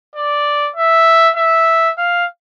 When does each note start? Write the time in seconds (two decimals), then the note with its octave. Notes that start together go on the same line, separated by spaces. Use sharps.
0.16 D5
0.76 E5
1.36 E5
1.98 F5